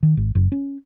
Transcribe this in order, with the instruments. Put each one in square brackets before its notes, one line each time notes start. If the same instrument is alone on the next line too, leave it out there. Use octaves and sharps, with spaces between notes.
[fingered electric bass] D#3
G#1
F#1
C#4